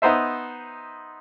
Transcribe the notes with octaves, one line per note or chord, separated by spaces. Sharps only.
B3 D#4 C5 E5